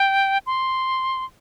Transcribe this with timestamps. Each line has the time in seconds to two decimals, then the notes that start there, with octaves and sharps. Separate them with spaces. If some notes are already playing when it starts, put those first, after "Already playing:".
Already playing: G5
0.46 C6